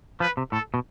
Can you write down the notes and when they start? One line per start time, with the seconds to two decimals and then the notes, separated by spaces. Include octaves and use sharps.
0.20 F3 B4
0.37 C3
0.52 A2 A4
0.74 B2